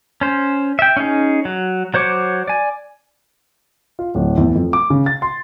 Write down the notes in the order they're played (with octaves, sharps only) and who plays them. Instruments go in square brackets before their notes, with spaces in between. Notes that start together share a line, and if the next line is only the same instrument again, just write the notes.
[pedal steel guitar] C#4 C5
E5 G5
C#4 D#4 G#4
F#3
F#3 C5 C#5 D6
D5 G#5
[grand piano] F4
D1
E2
F2
D6
C#3
A6
C6